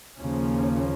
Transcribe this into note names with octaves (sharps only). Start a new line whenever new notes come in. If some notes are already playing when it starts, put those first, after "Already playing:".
D#2 C#3 F3 A#3 C#4